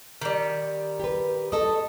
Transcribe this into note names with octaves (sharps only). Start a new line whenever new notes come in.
D#3 G3
G4 B4
A3 A4 D#5